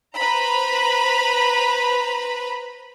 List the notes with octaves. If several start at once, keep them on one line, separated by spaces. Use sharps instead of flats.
B4 C5 A#5 B5